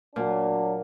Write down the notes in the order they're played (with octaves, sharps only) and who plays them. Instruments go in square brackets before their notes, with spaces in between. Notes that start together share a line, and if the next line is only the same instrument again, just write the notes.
[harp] A#2 [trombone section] F#3 D4